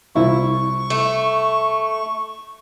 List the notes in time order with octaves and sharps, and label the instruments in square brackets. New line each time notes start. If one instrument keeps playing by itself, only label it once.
[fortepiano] C2 E4 F4 [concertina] C#6
[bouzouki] A3